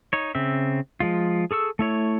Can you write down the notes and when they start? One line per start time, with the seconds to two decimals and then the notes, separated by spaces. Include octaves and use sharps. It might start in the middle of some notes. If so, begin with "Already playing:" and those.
0.13 D#4 C#5
0.35 C#3 C4 E5
1.00 F3 G#3 F4
1.51 G#4 A4 C#6 E6
1.79 A3 E4 C#5